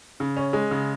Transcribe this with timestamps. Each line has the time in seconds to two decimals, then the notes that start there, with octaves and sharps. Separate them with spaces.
0.20 C#3
0.37 C#4
0.53 G#3
0.71 C#3